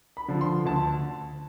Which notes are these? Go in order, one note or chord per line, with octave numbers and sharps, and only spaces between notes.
B5
D3 F3
C6
D2 A5